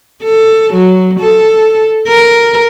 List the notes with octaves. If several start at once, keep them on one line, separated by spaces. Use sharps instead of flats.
A4
F#3
A4
A#4